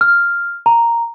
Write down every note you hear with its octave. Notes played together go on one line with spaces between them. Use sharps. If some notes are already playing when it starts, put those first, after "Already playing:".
F6
A#5